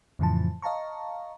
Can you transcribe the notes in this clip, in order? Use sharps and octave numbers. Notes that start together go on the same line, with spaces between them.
F2 A2 C#3 E3 F3 A5
D#5 F5 A5 A#5 C#6